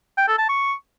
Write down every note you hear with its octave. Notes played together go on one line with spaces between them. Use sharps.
G5
A4
A5
C#6